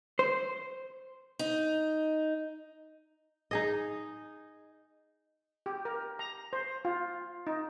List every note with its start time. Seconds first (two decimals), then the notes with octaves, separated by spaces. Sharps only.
0.19 C5
1.39 D#4
3.51 D#4 G#4 D#5
5.66 G4
5.85 A#4
6.19 A#5
6.53 C5
6.85 F4
7.47 D#4